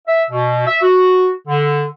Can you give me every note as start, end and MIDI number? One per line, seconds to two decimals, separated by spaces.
0.08 0.24 76
0.31 0.65 47
0.67 0.78 76
0.82 1.31 66
1.48 1.85 50